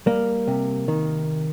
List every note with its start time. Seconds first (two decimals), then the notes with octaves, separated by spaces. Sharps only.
0.06 G3 A#3
0.47 C3
0.88 D#3